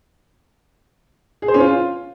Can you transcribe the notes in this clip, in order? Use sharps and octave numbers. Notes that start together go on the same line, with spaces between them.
G#4
C5
C#4
F4